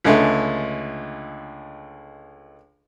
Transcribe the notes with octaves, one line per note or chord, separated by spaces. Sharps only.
C#2 D3 G#3 A3